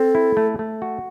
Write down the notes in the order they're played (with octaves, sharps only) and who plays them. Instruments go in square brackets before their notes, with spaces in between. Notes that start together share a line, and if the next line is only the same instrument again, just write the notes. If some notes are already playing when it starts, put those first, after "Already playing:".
Already playing: [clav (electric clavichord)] C4 [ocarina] A4
[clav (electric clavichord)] E4
A3
A3
F#4